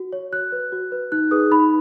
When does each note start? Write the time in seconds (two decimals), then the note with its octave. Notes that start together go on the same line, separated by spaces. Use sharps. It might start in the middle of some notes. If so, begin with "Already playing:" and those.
Already playing: F#4
0.13 C#5
0.32 F#4 F#6
0.52 B4
0.72 F#4
0.92 B4
1.12 D#4 F#6
1.31 G#4 B4 D#6
1.51 D#4 B5